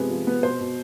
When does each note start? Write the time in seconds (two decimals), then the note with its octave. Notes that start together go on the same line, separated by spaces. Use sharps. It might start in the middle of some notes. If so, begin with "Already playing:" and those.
Already playing: C3 F3 G#3 B3 G#4 B4
0.10 F3
0.27 B3
0.43 B2 C5
0.60 B2